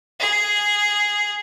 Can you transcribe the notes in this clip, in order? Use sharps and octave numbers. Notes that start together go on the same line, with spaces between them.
G#4